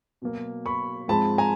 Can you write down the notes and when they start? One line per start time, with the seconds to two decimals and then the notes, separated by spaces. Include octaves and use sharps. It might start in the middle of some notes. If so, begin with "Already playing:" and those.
0.22 B2 F#3 A#3
0.66 B5 C#6
1.08 G#2 F3 G#3 C4 A5 B5
1.38 G#5 A#5